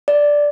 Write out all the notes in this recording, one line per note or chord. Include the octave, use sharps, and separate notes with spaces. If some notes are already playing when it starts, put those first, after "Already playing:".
D5